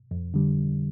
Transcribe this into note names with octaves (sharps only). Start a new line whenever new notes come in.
F2
D3 G3